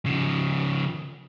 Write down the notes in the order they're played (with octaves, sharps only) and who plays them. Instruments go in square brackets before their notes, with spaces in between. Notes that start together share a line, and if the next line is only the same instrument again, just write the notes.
[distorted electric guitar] C#3 F3